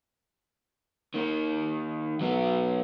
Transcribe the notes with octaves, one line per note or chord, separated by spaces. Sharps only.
D#3 A#3
F#3 B3